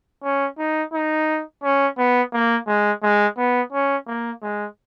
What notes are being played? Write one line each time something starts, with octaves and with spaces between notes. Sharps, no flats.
C#4
D#4
D#4
C#4
B3
A#3
G#3
G#3
B3
C#4
A#3
G#3